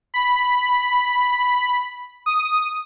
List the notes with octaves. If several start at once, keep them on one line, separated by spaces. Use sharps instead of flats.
B5
D#6